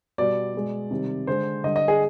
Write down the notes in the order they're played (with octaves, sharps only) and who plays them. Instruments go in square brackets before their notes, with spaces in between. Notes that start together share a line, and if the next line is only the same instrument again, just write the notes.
[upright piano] B2 G3 D5
B2 G#3
C3 D#3 G3
D3 G#3 C5
D3 G3 D#5
D#5
G#4